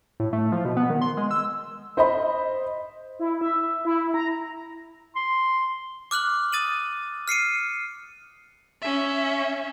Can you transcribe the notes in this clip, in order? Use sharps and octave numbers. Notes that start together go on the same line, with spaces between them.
A2
A3
F3
B2
B3
D#3
C6
G#3
E6
C5 D#5 B5
E4
E5
E4
A#5
C6
D6 F6 F#6 F#7
D#6 A6 D#7 F#7
F6 C7 C#7 D#7
C#4 E5